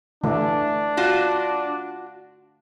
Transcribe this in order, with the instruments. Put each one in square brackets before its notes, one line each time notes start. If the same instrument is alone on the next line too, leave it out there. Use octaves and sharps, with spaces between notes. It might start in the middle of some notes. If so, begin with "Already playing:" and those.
[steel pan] D3 E3 A3 [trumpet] D4
[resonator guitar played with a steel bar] F4 F#4